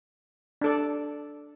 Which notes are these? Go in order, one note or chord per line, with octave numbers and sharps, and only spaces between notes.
D4 A4 D5